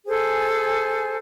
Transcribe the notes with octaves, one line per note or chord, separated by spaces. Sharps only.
G#4 A4 C5 G#5